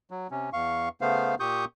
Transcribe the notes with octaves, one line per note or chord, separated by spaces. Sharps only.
F#3
C3 C#4
E2 F5 C#6
C#3 A3 B3 C5 F5
A#2 G4 C#6 D#6 G6